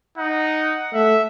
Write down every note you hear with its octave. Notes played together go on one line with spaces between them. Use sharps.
D#4 F#5
A3 E5